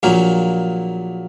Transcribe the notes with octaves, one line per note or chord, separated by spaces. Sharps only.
A#1 A#2 F#3 A#3